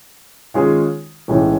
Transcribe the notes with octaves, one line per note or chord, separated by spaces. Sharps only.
D#3 G#3 C#4 F4 G#4
B1 A2 E3 G#3 C#4